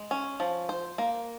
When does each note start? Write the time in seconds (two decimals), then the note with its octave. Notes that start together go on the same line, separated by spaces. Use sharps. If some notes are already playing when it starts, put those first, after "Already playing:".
Already playing: G#3
0.11 C#4
0.40 F3
0.69 C5
0.98 A#3